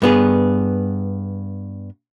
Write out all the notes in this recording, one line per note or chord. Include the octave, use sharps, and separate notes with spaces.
G2 B3 G#4